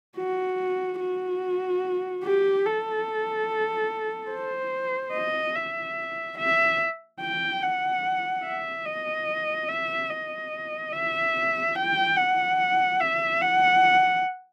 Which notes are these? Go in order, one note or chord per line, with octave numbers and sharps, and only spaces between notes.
F#4
F#4
G4
A4
C5
D#5
E5
E5
G5
F#5
E5
D#5
E5
D#5
E5
G5
F#5
E5
F#5